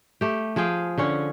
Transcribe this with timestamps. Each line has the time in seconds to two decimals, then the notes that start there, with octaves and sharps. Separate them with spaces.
0.21 A3 G4
0.56 F3 G#4 F5 G5
0.98 D3 C#4 C#5